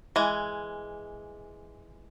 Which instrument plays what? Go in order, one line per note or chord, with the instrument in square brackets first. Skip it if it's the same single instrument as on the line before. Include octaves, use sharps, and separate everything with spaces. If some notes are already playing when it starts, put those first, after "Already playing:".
[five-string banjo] E3 G#3